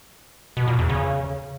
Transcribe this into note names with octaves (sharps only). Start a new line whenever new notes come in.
B2
A#2
E2
C#3